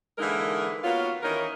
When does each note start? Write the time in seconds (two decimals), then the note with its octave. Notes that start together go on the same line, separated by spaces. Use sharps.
0.18 D3 E3 G#3 A#3 D#4 A#4
0.84 A#3 B3 F4 F#4 C#5 F5
1.23 D#3 E3 C#4 D#4 A#4